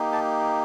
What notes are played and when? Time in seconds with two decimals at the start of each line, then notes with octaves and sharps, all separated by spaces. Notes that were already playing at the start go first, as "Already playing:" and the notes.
Already playing: A#3 D#4 G4
0.13 A5